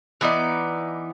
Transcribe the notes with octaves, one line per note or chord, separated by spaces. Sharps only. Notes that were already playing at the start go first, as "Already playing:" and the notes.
E3 B3 D#4 D5